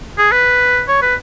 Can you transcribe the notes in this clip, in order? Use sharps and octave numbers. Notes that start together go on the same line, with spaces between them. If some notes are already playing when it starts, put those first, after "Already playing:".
G#4
B4
C#5
B4